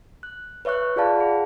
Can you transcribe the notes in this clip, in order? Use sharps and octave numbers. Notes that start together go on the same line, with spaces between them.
F#6
B4 C#5 E5 C#6 F#6
F4 G#4 D5 F5 A5 B5
G#4 F#5